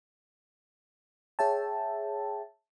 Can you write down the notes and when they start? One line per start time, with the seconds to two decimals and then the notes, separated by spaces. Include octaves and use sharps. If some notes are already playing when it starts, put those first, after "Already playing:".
1.39 G#4 C#5 E5 G5 A5